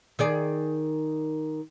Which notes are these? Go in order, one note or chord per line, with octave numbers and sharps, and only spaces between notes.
D#3 G#4 D5